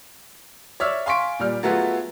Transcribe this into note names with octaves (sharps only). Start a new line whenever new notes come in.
C#5 D5 E5 E6 F6
F5 G#5 C6 C#6 B6 D7
A#2 G3 F6
F#3 A3 B3 F4 F#4 G#4